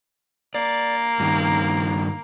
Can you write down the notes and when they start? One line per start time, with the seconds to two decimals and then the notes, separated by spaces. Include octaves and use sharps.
0.55 A#3 D5
1.20 G2 D#3